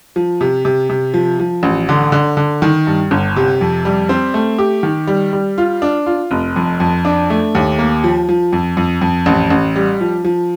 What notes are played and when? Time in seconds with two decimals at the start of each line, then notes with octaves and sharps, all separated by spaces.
0.16 F3
0.41 C3
0.65 C3
0.89 C3
1.14 F3
1.39 F3
1.63 A1
1.89 D3
2.12 D3
2.37 D3
2.62 D#3
2.87 G2
3.11 G1
3.36 C3
3.61 F2
3.85 G3
4.09 C4
4.34 A3
4.58 G4
4.83 D#3
5.07 G3
5.33 G3
5.58 F4
5.82 D4
6.06 F4
6.31 F1
6.56 F2
6.80 F2
7.05 D4
7.30 A3
7.55 D#2
7.79 A#3
8.04 F3
8.29 F3
8.53 F2
8.77 F2
9.01 F2
9.26 A1
9.50 A1
9.76 G3
10.01 F3
10.25 F3